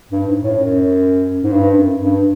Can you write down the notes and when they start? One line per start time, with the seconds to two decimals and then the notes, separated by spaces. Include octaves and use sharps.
0.11 G2
0.26 G#2
0.42 A2
0.58 F#2
1.44 G#2
1.53 G2
1.76 F#2
2.00 G2